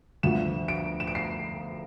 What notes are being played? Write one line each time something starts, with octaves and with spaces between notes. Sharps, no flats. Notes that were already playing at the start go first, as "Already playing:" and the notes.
D2 D3 F3 E7
D7
E7
D7
C7